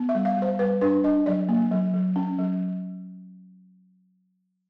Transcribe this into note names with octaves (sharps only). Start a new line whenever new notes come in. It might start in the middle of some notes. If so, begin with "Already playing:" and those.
Already playing: B3
E5
G3
F5
G3
C5
G3 B4
D4 B4
D4 D#5
F#3 D5
A#3
F#3
F#3
C#4
F#3